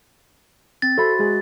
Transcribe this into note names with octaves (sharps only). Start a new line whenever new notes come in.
C4 A6
F#4 A4 C5 E5 B5
G#3 G#4 B4